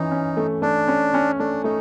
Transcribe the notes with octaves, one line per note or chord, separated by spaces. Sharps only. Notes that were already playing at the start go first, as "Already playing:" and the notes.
Already playing: E3 C#4 D#4
C#4
A3
A3 D4
C#4
C#4
A3 D4
A3 D#4